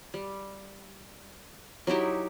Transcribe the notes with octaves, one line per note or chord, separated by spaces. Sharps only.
G3
F#3 D#4 E4 G4